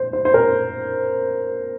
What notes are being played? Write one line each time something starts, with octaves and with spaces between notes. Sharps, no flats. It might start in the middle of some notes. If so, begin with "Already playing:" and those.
Already playing: C5
C5
C5
A#4